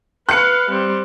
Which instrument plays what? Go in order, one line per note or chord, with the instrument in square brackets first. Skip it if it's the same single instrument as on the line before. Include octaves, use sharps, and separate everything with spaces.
[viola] B4 F5 [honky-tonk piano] F#6 C#7
[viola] G3 C4